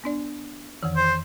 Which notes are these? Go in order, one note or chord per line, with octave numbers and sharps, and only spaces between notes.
B3 D4 D5
F2 D#3 E3
C5